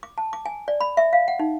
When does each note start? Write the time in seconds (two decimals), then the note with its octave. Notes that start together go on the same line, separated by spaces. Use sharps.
0.03 D6
0.18 A5
0.33 D6
0.46 G#5
0.68 D5
0.80 B5
0.97 E5
1.13 F5
1.28 F#5
1.39 D#4